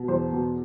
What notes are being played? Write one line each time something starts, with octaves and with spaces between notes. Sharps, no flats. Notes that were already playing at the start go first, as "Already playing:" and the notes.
Already playing: B2
E2 C5
B2